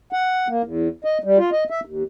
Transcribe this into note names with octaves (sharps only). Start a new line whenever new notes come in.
F#5
A#3
E2
D#5
G3
F4
D#5
E5
D#2